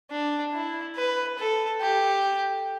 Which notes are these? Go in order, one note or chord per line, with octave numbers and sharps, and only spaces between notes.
D4
E4
B4
A4
G4